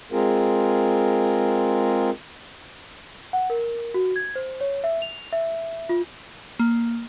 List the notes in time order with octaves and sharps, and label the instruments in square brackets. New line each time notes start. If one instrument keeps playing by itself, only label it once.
[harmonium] G#3 C4 F4 G#4 A#4
[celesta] F#5
A#4
F#4
G#6
C5
C#5
E5
F7
E5
F4
[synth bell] A#3